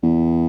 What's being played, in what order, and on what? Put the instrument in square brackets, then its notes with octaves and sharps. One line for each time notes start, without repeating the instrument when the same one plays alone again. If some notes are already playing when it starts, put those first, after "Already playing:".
[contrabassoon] E2